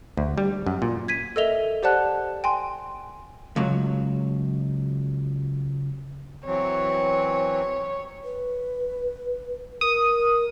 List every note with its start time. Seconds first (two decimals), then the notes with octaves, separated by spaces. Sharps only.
0.17 D2
0.38 G3
0.66 F#2
0.82 A#2
1.08 G#6 B6 D#7
1.36 A4 A#4 D#5 E5 F7 G7
1.83 G4 C5 D5 F#5 A5 F#6
2.44 G5 G#5 C6
3.56 C#2 F#3
6.46 E3 F#3 C4 C#5
8.24 B4
9.81 A#4 D#6